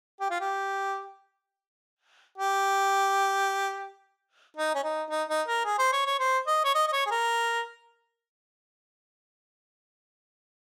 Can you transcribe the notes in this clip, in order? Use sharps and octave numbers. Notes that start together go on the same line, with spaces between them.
G4
F4
G4
G4
D#4
C#4
D#4
D#4
D#4
A#4
G#4
C5
C#5
C#5
C5
D#5
C#5
D#5
D#5
C#5
G#4
A#4